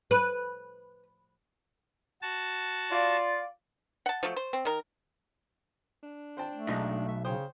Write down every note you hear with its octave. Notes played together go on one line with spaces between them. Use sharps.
B4
F#4 A5
F4 D5
F#5 A5
F3 F#3 A3
C5
C4
D#3 A#4
D4
C5 G5 A5
A3
B1 G#3 D#4
E5
C#3 C5 C#5 G5 D#6